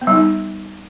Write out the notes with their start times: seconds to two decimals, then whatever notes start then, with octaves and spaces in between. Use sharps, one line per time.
0.01 B3
0.07 G3
0.13 D#4